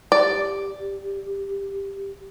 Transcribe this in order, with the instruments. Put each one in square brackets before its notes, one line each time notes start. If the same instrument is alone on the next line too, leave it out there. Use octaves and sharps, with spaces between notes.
[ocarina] G4 [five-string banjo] D5